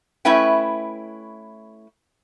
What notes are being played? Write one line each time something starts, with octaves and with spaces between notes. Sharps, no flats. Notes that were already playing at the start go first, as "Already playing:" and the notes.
A3 C#4 E4 B4 E5 G5